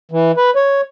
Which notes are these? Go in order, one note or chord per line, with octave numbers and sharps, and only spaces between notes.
E3
B4
C#5